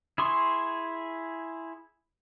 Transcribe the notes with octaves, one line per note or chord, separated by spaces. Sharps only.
E4 G#4 C6 C#6